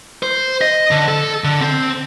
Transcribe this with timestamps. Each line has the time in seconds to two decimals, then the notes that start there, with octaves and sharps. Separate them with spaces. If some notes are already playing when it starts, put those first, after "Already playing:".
0.23 C5
0.61 D#5
0.91 D3
1.08 A4
1.44 D3
1.61 C4